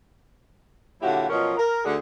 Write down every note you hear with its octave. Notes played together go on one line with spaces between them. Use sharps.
A#2 D3 F#3 E4 F#4 G4
B2 F3 F#3 C#4 A#4 D#5
A#4
D2 D3 G#4